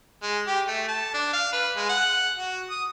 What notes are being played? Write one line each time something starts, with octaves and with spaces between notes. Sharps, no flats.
G#3
G4
A3
A5
D4
F5
B4
G#3
F#5
F#4
D#6